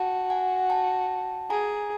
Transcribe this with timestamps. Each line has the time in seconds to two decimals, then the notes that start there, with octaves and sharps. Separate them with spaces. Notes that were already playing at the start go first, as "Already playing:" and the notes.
Already playing: F#4 G5 A5
0.30 F#5 G#5
0.70 G5 A5
1.50 G#4 G#5 A#5